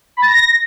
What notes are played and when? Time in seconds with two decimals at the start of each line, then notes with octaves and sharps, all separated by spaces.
0.17 B5
0.22 A6
0.27 A#6